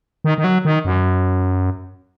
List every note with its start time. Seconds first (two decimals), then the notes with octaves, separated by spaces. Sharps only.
0.24 D#3
0.38 D#3
0.44 F#3
0.65 D#3
0.85 F#2